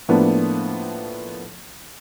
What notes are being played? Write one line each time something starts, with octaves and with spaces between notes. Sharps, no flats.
A2 F3 A#3 B3 D4